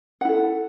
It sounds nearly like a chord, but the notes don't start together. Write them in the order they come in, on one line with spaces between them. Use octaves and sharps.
F#5 E4 A4